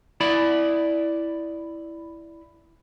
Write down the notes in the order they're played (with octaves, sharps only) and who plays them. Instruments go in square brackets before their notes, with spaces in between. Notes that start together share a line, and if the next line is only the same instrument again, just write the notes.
[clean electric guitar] E4 D5 B5